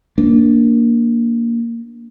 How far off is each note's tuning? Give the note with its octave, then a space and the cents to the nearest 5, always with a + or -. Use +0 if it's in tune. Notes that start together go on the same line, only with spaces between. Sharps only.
A#3 +0 D4 -10